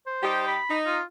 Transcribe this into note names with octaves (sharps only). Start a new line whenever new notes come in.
C5
G3 D#4 G4
B5
D#4
F4